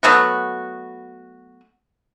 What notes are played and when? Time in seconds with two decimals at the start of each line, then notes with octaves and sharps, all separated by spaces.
0.03 F#3 A3 B3 F#4